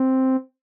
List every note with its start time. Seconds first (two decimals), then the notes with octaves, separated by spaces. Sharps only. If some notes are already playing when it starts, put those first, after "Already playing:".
Already playing: C4